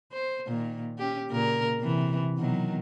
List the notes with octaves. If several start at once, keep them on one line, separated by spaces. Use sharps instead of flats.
C5
A#2 D#3
C#4 G4
A#2 C#3 A#4
C3 E3
B2 D#3 F#3